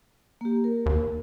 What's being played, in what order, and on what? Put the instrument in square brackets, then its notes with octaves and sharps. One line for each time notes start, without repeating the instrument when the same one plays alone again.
[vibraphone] A#3 G4
A#4
[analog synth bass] D#2